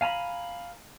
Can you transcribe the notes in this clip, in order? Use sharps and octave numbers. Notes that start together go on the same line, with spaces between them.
F5 G#5 A#5 B5